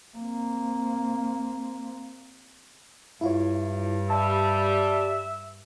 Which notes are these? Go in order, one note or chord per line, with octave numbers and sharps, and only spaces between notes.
A#3 C4
G2 E4 F4 C#5
G3 E5 A5